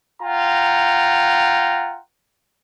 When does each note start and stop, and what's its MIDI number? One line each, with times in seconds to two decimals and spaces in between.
0.23 1.98 65
0.23 1.98 78
0.23 1.98 79
0.23 1.98 82